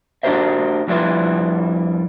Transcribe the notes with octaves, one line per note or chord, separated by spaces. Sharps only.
D4 F#4 G4 A#4 C5 E5
F2 G3 D4 E4 F4 B4